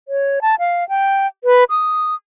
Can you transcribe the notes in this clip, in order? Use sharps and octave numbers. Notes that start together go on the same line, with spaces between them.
C#5
A5
F5
G5
B4
D#6